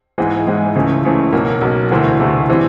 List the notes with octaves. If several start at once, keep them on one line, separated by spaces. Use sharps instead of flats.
G#2 E3 G#3
G#2 E3 G#3
C#2 C#3 E3 A3
C#2 C#3 E3 A3
B1 B2 F#3 A#3
B1 B2 F#3 A#3
D2 C3 E3 A3 C4
D2 C3 E3 A3 C4
E3 G3 C4